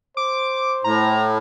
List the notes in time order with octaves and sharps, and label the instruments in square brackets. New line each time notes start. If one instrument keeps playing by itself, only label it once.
[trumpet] C5 [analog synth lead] D6
[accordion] A2 [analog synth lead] A#5